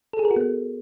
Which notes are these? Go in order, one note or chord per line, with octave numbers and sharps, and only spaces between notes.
A4
G#4
A#4
F#4
B3